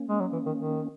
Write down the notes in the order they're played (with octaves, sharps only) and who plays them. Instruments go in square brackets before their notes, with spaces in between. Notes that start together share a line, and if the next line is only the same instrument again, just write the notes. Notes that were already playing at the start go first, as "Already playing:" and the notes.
Already playing: [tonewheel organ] A#3 C#4
[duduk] G#3
F#3
E3
D#3
D#3